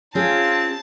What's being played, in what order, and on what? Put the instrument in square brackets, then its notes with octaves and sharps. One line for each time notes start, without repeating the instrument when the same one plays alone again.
[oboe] C4 [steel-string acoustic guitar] C#4 G#4 [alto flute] F4 [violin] A5